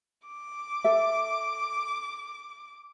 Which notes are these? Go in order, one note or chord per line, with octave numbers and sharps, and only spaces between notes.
D6
A4 E5